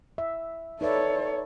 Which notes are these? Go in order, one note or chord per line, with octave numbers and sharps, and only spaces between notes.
E5
D#4 A4 B4 C#5 D5 E5